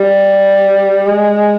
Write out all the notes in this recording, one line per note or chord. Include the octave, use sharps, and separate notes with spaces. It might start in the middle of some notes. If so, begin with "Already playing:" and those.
Already playing: G3
G#3